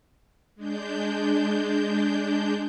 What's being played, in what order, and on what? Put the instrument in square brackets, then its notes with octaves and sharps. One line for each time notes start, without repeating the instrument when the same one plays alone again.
[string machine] G#3 D4 G6